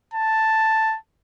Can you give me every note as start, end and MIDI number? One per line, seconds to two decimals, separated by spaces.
0.14 0.97 81